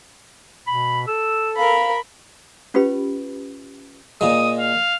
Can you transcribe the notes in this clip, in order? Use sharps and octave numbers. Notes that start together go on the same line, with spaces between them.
B2 B5
A4 E6
A#4 F5 B5
C#4 F4 G4 B4 B5
A#2 G#3 D#6
F5